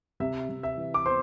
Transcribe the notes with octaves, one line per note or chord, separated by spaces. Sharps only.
C3 E5
C3
E5
E3
D6
B3 C5 C6